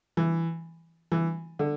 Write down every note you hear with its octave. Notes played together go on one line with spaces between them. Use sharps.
E3
E3
D3